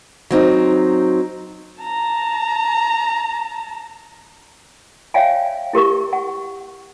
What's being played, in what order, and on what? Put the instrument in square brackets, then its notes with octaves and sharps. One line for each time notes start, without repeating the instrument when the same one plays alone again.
[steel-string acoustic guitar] F#3 C4 D#4
[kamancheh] A5 A#5
[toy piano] C#5 D5 E5 F5 G5 G#5
E4 G4 A#4 C#6
F#5